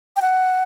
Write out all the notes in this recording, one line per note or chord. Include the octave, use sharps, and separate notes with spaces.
G5
F#5